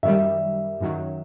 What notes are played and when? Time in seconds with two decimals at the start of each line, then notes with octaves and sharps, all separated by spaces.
0.03 F#2 D#3 G3 E5
0.81 F#2 D#3 F#3